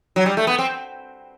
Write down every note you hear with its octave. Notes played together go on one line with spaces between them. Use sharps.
F#3
G3
A3
B3
C4